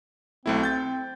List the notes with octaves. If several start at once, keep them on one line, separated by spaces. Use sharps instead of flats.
B1 A3 C4 E4
G5 G6 A6